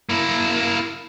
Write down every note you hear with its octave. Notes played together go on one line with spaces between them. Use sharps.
A#3 E4